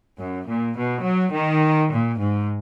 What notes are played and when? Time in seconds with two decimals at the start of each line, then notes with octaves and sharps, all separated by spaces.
0.19 F#2
0.48 A#2
0.77 B2
1.04 F#3
1.33 D#3
1.91 A#2
2.21 G#2